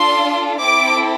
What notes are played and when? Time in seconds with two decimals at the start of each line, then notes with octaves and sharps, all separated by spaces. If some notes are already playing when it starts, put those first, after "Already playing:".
Already playing: D4 F4 A4 C6
0.61 C4 E4 A4 D6